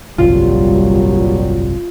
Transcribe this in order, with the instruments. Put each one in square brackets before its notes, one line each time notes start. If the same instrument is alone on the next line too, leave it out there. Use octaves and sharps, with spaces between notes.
[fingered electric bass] G1 C2 F2 [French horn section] A#2 F#3 G3 [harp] F4